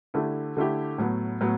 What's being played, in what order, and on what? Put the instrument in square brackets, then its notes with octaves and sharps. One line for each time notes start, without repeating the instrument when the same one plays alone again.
[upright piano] D3 A3 E4 G4
D3 A3 E4 G4
A2 F#3 B3
A2 F#3 B3